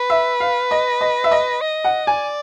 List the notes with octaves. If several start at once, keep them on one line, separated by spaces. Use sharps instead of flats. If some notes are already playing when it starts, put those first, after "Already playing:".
Already playing: B4
E5
F5
D#5
D#5
E5
D#5
D#5
F#5
D5 G#5